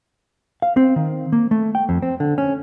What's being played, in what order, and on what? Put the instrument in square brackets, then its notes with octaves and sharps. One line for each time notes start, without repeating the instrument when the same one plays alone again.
[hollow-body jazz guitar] F5
C4
D#3
A#3
A3
G5
F2
C4
D3
C#4